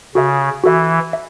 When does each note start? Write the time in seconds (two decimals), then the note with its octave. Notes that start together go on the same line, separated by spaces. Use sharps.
0.15 C#3 F#4 A4 E5
0.64 E3 F#4 A4 E5
1.13 E5